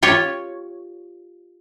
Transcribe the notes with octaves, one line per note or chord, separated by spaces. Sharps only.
F4 G4 C#5